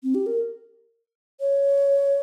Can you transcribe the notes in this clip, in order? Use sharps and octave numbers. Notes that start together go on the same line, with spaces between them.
C4
G4
A#4
C#5